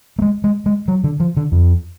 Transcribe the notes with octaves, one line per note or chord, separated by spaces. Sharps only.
A3
G#3
G#3
G#3
F#3
D3
F3
D3
F2